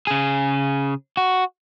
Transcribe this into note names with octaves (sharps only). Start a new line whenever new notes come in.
C#3 G#4
F#4